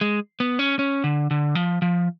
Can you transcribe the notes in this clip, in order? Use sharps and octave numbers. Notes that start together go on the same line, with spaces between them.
G#3
B3
C#4
C#4
D3
D3
F3
F3